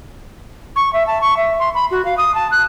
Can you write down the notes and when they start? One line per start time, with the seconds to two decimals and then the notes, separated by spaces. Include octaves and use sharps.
0.75 C#6
0.93 E5
1.07 A5
1.20 C#6
1.36 E5
1.59 C6
1.74 B5
1.90 F#4
2.05 F5
2.17 D#6
2.34 A5
2.51 F#6